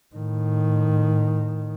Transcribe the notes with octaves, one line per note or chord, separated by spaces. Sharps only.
A2 D#3